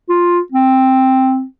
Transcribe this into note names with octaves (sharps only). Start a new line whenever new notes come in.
F4
C4